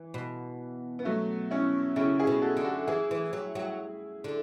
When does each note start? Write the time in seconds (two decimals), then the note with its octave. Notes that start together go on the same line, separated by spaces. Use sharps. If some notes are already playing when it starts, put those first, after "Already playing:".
Already playing: E3
0.14 B2
0.99 B3
1.05 F#3 A3
1.51 C#4 E4
1.96 C#3 C#4 E4
2.19 E4 G#4
2.27 B2
2.42 F#4 A4
2.57 D3
2.65 F#4 A4
2.87 E3 E4 G#4
3.11 E3
3.33 F#3
3.55 F#3
4.24 D3